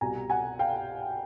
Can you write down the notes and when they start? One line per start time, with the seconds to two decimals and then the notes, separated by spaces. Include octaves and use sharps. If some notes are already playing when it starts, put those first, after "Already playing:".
0.01 C2 B2 G3 G#5 A#5
0.30 F#5 G#5
0.59 F5 G5